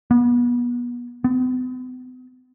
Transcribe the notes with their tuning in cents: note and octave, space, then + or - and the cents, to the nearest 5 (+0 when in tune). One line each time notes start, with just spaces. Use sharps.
B3 -30
B3 +45